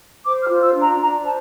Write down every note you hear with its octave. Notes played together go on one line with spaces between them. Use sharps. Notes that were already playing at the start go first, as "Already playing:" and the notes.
C5 D6
F6
F4
E6
D4
A#5
D4 A#5
C5 A5